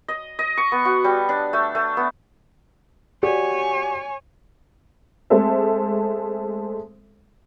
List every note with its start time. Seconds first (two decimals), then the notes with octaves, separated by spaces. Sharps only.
0.08 D#5
0.39 D#5
0.57 C#6
0.72 B3
0.85 F#4
1.04 G3
1.29 D4
1.53 A3
1.75 A3
1.97 B3
3.23 F#4 G4 C#5 D5 G#5
5.30 G#3 A3 C4 A4 C5 E5